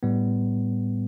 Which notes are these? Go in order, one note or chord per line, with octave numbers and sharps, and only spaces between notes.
A2 G3 B3